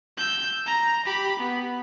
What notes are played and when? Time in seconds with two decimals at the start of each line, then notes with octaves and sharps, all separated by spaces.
0.18 E6 G6
0.67 A#5
1.05 G4 B5
1.39 B3